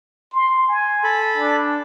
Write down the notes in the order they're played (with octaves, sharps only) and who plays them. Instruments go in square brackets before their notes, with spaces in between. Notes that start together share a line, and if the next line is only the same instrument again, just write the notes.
[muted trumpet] C6
G#5
[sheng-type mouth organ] A4 B5
[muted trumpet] D4